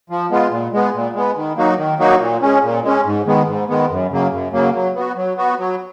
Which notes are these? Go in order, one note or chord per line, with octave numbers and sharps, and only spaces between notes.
F3
G#3 B3 F4
A#2
G#3 B3
A#2
G#3 B3
D#3
F#3 A#3 D#4 F#4
D#3
F#3 A#3 D#4 F#4
A#2
G#3 C#4
A#2
G#3 C#4
G#2
D#3 G#3 B3
G#2
D#3 G#3 B3
F#2
C#3 F#3 A#3
F#2
C#3 F#3 A#3
F#3
B3 F#4
F#3
B3 F#4
F#3